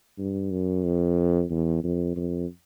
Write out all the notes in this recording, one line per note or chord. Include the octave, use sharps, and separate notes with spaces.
G2
F#2
F2
E2
F2
F2